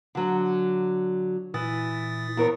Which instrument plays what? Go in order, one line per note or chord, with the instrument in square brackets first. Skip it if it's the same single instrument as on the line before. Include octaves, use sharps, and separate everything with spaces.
[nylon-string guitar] D3 F#3
[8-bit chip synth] A#2 D#6 A6 [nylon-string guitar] E3
[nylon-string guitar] E2 A#4 C#5